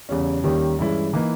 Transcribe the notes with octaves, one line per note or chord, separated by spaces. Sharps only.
E2 C#3 G3 C#4
D#2 D#3 G3 C#4 G4
G2 E3 G#3 C#4 E4
E3 A#3 D#4